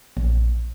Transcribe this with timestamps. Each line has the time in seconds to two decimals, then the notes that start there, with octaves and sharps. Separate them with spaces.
0.17 A#1